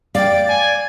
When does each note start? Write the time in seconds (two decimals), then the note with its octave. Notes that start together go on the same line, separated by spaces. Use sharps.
0.15 D5 F5 G5
0.49 G#5